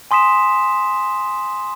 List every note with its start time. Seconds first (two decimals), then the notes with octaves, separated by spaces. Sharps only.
0.11 G#5 C6 D#6 B6 E7